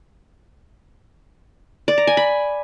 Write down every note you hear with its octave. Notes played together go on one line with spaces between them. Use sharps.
D5
A#5
G#5
B5